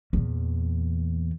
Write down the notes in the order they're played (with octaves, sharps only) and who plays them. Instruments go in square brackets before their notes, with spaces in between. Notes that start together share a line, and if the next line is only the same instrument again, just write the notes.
[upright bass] E2 A#2